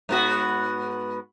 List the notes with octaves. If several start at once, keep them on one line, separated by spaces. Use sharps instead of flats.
G#2 B3 F#4